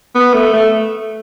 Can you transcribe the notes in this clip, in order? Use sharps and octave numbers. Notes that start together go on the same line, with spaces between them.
B3
A3
A3